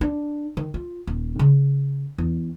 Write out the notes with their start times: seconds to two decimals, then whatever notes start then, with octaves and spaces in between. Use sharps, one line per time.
0.01 D4
0.57 D#3
0.74 F4
1.07 D#1
1.39 C#3
2.18 E2